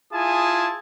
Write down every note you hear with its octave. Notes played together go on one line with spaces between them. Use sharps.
E4 F4 G#4 G#5 A5 D#6